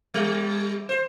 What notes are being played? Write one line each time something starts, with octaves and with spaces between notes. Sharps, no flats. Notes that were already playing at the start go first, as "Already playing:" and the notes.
G3
C5